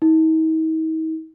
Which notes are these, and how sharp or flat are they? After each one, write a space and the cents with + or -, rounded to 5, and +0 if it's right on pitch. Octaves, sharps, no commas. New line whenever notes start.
D#4 +45